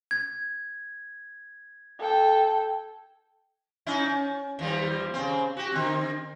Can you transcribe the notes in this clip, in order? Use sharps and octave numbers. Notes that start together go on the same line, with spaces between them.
G#6
A4 G5
C#4 D#4 E4
C#4
D#2 F3 G3
C#3 C4
F#4 G4
D3 C4